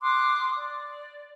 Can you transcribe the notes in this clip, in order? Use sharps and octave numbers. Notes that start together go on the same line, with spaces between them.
C6 D6 D#6 F#6
D5